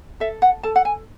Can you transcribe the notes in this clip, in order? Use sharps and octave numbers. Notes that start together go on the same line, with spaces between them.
A4 E5
F#5
A4 A5
F#5
G#5